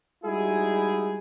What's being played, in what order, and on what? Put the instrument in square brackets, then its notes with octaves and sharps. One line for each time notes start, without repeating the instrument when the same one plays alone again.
[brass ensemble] G3 G#3 D#4 E4 F#4 G#4